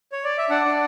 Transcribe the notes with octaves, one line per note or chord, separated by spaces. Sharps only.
C#5
D5
E5
D4 D5 F#5
D4